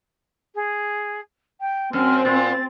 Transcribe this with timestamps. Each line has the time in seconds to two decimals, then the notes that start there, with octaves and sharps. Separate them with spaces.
0.55 G#4
1.61 G5
1.93 F#2 C4 F6
2.25 A#2 A6